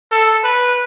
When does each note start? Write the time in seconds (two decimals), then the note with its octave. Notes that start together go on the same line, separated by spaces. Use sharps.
0.11 A4
0.43 B4